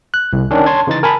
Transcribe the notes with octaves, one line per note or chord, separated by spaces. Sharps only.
F#6
C2
D#3 C#4 D4
C#5 A5 C6 G#6
C#3 E3 D#4 A6
A#4 G#5 A5 B5